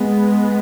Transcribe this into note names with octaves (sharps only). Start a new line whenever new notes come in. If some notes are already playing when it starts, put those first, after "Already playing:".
Already playing: G#3 B3